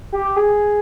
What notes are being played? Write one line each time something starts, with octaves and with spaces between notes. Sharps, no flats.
G4
G#4